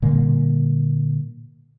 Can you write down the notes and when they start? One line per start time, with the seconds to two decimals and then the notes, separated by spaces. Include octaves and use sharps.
0.02 A#2 D3 G3 A#3